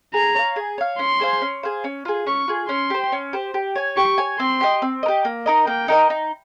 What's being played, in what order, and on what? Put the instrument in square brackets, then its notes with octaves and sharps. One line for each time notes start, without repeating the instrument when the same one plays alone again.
[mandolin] G#4 [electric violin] A#5
[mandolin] C#5 F5
G#4
C#5 F5
[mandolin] C#4 [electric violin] C6
[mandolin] G#4 C5 F5
C#4
G#4 C5 F5
C#4
F4 G#4
[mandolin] C#4 [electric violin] C#6
[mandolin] F4 G#4
[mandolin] C#4 [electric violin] C6
[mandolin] G4 C5
C#4
G4 C5
G4
C#5 G#5
[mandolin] G4 [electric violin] C#6
[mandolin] C#5 G#5
[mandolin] C4 [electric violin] C6
[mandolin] G4 A#4 D#5
C4
A#4 D#5
G4
A#3
D#4 A#4 D#5
[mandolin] A#3 [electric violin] G5
[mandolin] D#4 A#4 D#5
D#4